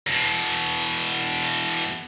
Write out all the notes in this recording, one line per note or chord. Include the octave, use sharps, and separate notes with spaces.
E2 B2